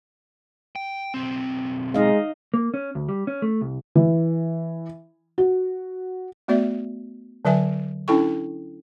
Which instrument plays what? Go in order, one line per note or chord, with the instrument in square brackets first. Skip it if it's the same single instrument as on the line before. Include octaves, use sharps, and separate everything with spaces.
[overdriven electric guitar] G5
B1 C4
[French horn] G#3 [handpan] D#4 D#5 F5
[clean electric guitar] A#3
C#4
D2
G3
C#4
A3
C2
[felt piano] E3
F#4
[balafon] A3 B3 F#4 D5 E5
D3 F#3 B4 E5 G#5
C#4 D4 E4 A4 G5 C#6